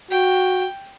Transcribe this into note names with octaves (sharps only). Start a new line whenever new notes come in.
F#4 G5